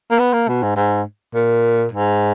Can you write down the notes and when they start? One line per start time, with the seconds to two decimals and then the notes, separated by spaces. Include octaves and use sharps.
0.11 A#3
0.19 B3
0.33 A#3
0.48 B2
0.63 G#2
0.76 G#2
1.34 A#2
1.92 G#2